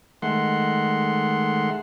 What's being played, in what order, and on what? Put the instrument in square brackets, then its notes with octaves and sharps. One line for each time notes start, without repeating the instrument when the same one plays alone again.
[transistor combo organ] D#3 G#3 A3 F#5 C6